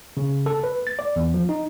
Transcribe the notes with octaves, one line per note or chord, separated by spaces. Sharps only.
C#3
A4
B4
A6
D5
E2
F3
D#4